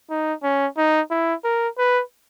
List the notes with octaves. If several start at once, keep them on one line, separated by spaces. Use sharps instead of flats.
D#4
C#4
D#4
E4
A#4
B4